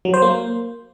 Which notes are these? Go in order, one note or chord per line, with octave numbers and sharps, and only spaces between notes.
F#3
C5
A#3